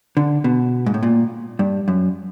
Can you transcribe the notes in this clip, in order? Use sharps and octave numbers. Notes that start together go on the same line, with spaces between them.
D3
B2
G#2
A2
A#2
G2
F#2